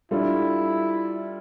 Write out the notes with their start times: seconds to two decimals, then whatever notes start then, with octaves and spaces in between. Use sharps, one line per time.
0.11 G3 D4 E4 F4 A4